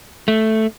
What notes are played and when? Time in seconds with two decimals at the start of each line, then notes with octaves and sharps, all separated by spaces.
0.28 A3